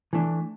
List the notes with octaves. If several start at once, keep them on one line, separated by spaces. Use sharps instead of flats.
E3 A3 D4